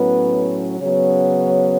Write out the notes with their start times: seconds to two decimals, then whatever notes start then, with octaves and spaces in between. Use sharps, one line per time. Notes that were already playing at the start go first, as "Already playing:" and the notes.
Already playing: A2 F#3 B3 C#4 B4
0.80 C#3 F#3 B3 C#4 C#5